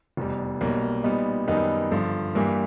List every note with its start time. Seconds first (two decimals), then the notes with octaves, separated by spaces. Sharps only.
0.17 F1 E2 B2 G3
0.61 B1 B2 G3 A#3
1.04 A#2 G3 B3 D#4
1.47 F#2 D#3 G3 B3 D#4
1.91 G2 D3 F3
2.35 G2 E3 G3 A#3